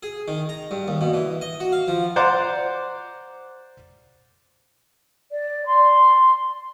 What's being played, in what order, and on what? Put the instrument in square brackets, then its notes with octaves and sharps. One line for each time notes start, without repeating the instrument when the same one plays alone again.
[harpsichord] G#4
D#3
A#5
G2
D#2
B2
E3
D#5
F#4
F5
F3
[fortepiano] C5 D5 F#5 A#5 D6
[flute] D5
C6